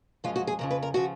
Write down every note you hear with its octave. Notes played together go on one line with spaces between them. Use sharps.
F#2 F3 G#3 F4
F#4
G#4
F2 C#3 F3 A#4
B4
A#4
C#3 F3 F#4